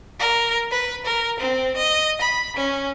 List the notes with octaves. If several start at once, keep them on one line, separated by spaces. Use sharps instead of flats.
A#4
B4
A#4
C4
D#5
B5
C#4